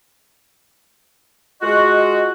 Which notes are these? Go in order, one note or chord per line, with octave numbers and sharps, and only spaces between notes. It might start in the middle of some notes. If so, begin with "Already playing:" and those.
G#3 F4 F#4 D#5